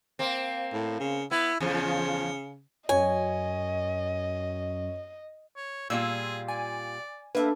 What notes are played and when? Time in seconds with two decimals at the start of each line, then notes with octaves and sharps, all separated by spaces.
0.19 A#3 C4
0.73 A2
1.00 C#3
1.31 B3 E4
1.60 E2 C#3 F3
2.89 F#2 C#5 D#5 G#5
5.56 C#5
5.90 A#2 G3 F4 G#4 E6
6.48 D5 G#5
7.35 A#3 D4 A4 B4 E5 A5